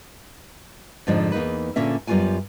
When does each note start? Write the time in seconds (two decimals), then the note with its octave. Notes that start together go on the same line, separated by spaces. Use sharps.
1.07 F2 G#2 D3 F3 G#3 D4
1.32 E2 A#3 D#4 B4
1.76 A#2 D3 C#4 E5
2.07 F#2 G3 B3 F4 F#4 G#5